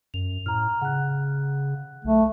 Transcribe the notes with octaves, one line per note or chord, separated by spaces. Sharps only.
F#2 F7
A2 A#5 F6
C#3 F#5 F#6
B1 A3